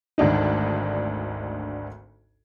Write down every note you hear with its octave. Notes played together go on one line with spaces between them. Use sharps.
G#1 D2 D4 D#4